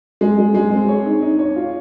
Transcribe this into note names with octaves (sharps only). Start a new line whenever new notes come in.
G#3
G#3
G#3
C4
C#5
D#4
D#4
C#5
F4